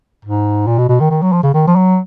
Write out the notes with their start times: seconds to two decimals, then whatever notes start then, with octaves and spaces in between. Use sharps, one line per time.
0.25 G#2
0.67 A#2
0.78 B2
0.89 B2
1.00 D#3
1.10 D#3
1.22 F#3
1.32 F3
1.43 C#3
1.54 D#3
1.67 F3
1.75 F#3